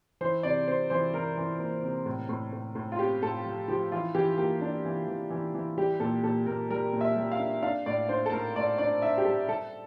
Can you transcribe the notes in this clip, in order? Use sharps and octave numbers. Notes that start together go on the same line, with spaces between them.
E3 C5
C3 D5
C3 C5
E3 C5
E3 A#4
E3
A#3
C3
A2
A2
A2
A2
F4
C4 G4
A2 A4
F3
F3 G4
E3 F4
E3 G4
A#3 G4
D4
E3
E3
E3
E3
G3 G4
A#2 A4
A#2 A4
A#2 A#4
G3 A#4
A#2
E5
G3
F5
D4
D4 F5
A2 D5
D4 C5
A4
A2 A#4
A2 D5
D4 D5
D4 E5
G4
G3 A4
G3 A4